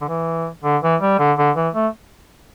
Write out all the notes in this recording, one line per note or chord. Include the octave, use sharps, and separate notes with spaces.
D3
E3
D3
E3
G3
D3
D3
E3
A3